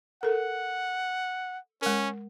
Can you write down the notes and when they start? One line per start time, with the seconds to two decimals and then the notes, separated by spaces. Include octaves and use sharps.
0.23 A4 A#4 F#5
1.82 G#3 C#4 A#4